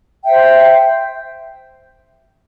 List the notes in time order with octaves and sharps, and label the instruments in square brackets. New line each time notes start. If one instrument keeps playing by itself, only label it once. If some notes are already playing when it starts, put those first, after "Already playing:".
[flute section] C5 E5 G5